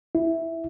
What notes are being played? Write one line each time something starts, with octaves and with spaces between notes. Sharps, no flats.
E4